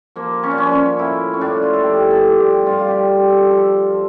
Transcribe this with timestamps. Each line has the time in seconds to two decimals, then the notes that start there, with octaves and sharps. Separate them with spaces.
0.16 F3 A#3
0.43 C#4
0.51 D4
0.57 F3 C#4
0.72 C#4
0.99 A2 E4
1.34 C#4
1.41 A2 D4
1.62 F4
1.74 A4
1.83 F3 G4
2.11 A4
2.25 G2
2.39 G4
2.66 G2 F4
2.79 F4
2.88 G4
3.08 G2 G4
3.30 A4
3.50 F3 A4
3.92 F3